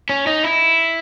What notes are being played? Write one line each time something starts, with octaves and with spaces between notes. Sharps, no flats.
C#4
D#4
E4